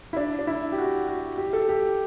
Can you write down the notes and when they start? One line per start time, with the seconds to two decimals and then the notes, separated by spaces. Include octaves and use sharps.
0.13 E4
0.17 D4
0.39 D4
0.47 E4
0.72 G4
0.78 F#4
1.09 F#4
1.38 G4
1.53 A4
1.69 G4